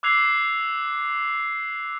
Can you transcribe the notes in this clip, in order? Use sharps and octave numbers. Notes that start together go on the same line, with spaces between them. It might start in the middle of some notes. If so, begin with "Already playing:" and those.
D6 E6 F#6 G#6 C7 F7